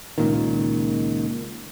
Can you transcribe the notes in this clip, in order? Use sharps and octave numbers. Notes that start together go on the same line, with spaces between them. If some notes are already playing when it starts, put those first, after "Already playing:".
C#2 A#2 D#3